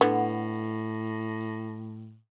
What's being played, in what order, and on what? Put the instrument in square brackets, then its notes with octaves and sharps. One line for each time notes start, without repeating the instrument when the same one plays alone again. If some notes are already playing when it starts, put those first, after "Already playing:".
[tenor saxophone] A2 [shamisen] D3 B3